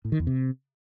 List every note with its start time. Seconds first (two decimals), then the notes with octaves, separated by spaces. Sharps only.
0.05 A2
0.12 D#3
0.19 E2
0.27 C3